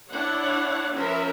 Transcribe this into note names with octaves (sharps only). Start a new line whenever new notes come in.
D4 E4 C#5 F#5
F3 C#4 A#4 B4 E5